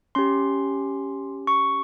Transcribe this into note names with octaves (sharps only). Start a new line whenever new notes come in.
C#4 G4 C6
C#6